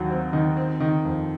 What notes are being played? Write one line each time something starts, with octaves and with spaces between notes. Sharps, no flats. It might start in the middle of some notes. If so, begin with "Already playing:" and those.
Already playing: D#2 D#3 F#3
C4
D#3
C4
D#3
F2